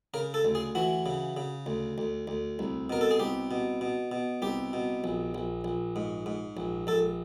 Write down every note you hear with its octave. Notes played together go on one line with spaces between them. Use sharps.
C#3 A#4
A4
D2
G#4
E3 F#4
C#3
C#3
D2
D2
D2
C2
B2 A#4
A4
G#4
C2 G4
B2
B2
B2
C2 G4
B2
A#1
A#1
A#1
G#2
G#2
A#1
A#1 A4